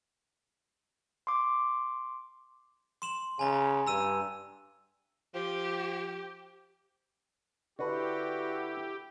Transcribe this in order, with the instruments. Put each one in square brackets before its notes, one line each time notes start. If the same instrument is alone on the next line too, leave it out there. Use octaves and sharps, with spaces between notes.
[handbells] C6 D6
[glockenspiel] C6 E7 F#7
[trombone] C#3 [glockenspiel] G#5 A#5
[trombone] G2 [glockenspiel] A#5 E6 D#7
[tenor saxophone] F3 [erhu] G4
[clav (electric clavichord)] D3 B4 [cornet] E4 [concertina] F#4 [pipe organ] G4